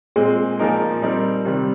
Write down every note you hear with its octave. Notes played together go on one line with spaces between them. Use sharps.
A#2 G#3 C4
A#2 F3 A#3 D#4 A#4
G3 C4 D#4 A#4
C3 D#3 G3 C4